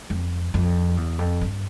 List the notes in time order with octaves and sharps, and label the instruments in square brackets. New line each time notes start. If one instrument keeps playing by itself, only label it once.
[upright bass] F2
F2
E2
F2
G2